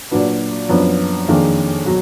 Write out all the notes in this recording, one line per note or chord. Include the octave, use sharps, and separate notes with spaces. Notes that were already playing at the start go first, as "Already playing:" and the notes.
A#2 F#3 D4 F#4 B4
F#2 F3 B3 D4
F2 D#3 A#3 D4 G#4
B2 F#3